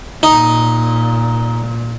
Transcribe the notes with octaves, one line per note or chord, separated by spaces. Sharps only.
A#2 D#4